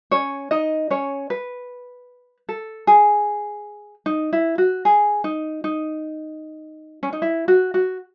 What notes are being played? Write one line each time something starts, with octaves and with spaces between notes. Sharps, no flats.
C#4 C#5
D#4 D#5
C#4 C#5
B4
A4
G#4
D#4
E4
F#4
G#4
D#4
D#4
C#4
D#4
E4
F#4
F#4